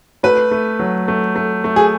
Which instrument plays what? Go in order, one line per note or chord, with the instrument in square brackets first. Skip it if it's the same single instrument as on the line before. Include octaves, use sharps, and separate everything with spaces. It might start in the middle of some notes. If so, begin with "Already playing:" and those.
[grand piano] A3 [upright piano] B4
[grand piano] A3
F#3
A3
A3
A3
[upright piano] G#4